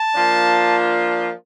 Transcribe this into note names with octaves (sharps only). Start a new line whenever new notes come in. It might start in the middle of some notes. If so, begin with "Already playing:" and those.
Already playing: A5
F3 A#3 D4 F4